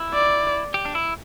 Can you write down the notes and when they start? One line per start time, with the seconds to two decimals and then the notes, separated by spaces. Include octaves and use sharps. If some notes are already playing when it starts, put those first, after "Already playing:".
Already playing: E4
0.14 D5
0.74 G4
0.85 D4
0.95 E4